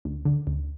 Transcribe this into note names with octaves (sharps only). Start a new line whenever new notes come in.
D2
D3
D2